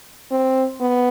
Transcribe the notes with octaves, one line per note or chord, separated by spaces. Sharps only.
C4
B3